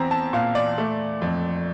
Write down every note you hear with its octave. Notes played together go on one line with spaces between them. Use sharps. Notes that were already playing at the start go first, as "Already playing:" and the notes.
Already playing: E2 C4 A#5
A5
A#2 F5
D5
A3
F2